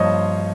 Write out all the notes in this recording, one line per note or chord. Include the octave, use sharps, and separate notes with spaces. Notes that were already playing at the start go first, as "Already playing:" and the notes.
Already playing: G2 F3 A#3 C5 C#5 D#5